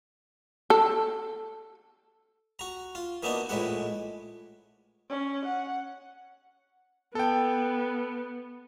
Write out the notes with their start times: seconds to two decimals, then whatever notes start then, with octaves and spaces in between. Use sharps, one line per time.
0.70 A4
2.59 F#4 A#5
2.95 F4
3.23 E3 A#3 B3 D4 D#4 F#4
3.49 A#1 A2 E3 G#3 F#5
5.09 C#4
5.46 F#5
7.15 B3 A4 G5